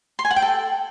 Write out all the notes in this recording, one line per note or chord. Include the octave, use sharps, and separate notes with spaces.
C6
G#5
F#5
G5
A4